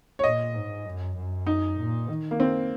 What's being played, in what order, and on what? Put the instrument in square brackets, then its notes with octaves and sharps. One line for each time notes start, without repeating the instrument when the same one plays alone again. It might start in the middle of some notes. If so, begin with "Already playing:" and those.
[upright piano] C#5
[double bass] A#2 [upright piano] D#5
[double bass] G#2
F#2
F#2
[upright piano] D#4
[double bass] A#2
D#3
[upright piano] A#3
C4